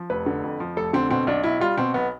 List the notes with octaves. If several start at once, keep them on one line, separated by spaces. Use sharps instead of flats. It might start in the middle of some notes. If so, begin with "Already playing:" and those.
Already playing: F3
F1 B4
D3
F2
F3
F1 A4
D3 C4
B2 C4
B1 D4
B1 E4
G3 F4
B2 C4
B1 B3